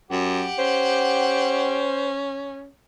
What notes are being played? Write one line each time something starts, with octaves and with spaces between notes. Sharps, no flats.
F#2 G4 F#5
C#4 C5